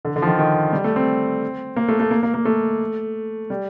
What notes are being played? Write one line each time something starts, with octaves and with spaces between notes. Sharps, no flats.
D3
D3
F3
D#3
D#3
G3
A3
C4
A#3
A3
A3
A#3
A#3
A#3
A3
G3